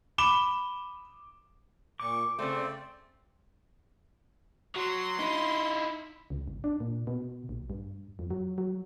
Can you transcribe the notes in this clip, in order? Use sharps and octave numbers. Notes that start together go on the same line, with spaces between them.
B5 D6 E7 G7
A#2 C#6 D6
C#3 A3 C4 D5
F#3 C6
D#4 E4
C#2
G1
D4
A#2
B2
A#1
G2
F2
F#3
F#3